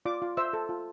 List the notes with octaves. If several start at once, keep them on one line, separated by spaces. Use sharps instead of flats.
F4 D5 D6
F4
C5 E5 E6
A4
F4